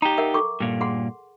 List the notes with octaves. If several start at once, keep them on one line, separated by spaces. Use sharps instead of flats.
D#4 G4 A#5
A#4 E5 F#5
A4 C#6 D6
G2 A#2
G#4 F#5 C6